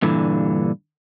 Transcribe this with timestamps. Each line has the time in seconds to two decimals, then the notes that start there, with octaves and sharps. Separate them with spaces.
0.02 G2 A#2 D3 E3